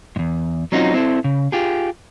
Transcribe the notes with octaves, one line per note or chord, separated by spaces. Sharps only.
E2 G#2
F#3 C4 C#4 D#4 F4 F#4
C4 E4 A4
C#3
F4 G4 G#4